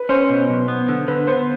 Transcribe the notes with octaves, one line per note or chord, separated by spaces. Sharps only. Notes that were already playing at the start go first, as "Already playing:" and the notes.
Already playing: B4
C#4 C5
B2
B1
B3
D3
D3 B4
B3 C5